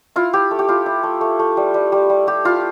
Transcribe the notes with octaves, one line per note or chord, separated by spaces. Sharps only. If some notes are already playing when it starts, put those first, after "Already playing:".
E4 F4
E4 G4
A3
G4
E4 F4
E4
A3
A3
A3
G3
G3
G3
G3
G3 G4
E4 F4